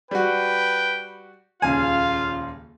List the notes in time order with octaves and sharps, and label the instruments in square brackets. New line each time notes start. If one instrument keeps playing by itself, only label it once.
[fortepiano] G3 F#4 [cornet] B4 [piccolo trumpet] G5
[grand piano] D#1 C#2 C#3 [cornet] F4 [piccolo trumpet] F5 [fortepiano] G#5